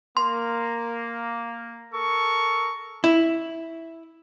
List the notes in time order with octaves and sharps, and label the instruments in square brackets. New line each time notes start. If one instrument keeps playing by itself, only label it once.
[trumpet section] A#3 [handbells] C6
[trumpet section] A4 A#4 C#6
[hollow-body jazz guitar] E4